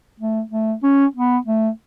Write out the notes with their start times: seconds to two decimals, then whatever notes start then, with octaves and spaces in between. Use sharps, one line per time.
0.20 A3
0.51 A3
0.83 C#4
1.16 B3
1.47 A3